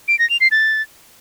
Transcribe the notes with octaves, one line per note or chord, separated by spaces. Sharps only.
D7
A#6
F7
C7
A6